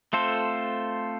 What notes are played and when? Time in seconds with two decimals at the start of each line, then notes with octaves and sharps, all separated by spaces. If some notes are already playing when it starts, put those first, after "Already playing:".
0.13 A3 C4 F4 A4 C5